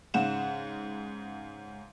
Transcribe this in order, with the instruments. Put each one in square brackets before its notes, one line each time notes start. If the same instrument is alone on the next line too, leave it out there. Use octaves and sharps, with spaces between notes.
[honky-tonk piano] G#2 C#3 F#5 E7